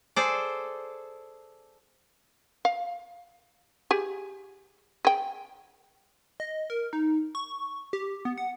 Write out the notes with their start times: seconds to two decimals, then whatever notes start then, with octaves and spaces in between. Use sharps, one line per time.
0.16 G#4 A4 C5 D5
2.65 F5
3.91 G4 G#4
5.05 G#4 G5
6.40 D#5
6.70 A#4
6.93 D#4
7.35 C#6
7.93 G4
8.25 B3
8.38 F#5